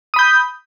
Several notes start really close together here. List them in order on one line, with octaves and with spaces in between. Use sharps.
D#6 B5 G6